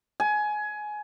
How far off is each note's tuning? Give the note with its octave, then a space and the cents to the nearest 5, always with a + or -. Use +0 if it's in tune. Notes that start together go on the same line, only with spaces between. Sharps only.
G#5 +20